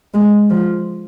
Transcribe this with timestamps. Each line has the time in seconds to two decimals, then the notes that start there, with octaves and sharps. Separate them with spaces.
0.14 G#3
0.50 F3